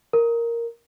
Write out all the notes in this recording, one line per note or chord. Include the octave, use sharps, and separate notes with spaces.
A#4